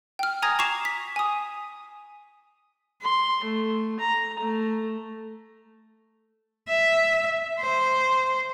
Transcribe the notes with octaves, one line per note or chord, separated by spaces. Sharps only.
G5 F6
G#5 A#5 D#6 G#6 A#6
A#5 C#6 D6 C7 E7
B6
G#5 D#6
C6
A3
A#5
A3
E5
C5